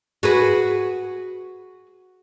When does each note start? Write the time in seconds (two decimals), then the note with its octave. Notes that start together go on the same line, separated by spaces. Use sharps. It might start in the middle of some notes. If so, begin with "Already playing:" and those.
0.23 F#4 G#4 B4